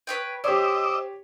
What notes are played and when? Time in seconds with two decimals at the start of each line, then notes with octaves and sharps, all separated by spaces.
0.07 B4 C#5 G5
0.44 G4 C5 C#5 D#5 D6 E6